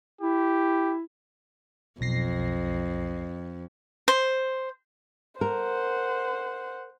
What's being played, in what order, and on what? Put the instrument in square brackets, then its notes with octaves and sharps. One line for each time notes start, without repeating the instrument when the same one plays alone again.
[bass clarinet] E4 [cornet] G4
[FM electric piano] B1 A#6 C7 [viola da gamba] F2
[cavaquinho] C5
[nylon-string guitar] A#4 [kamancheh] C5 F#5